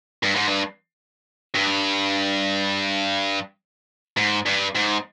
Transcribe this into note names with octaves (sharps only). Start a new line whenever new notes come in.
G2
G#2
G2
G2
G#2
G2
G#2